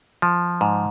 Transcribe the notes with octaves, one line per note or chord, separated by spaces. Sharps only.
F3
G#2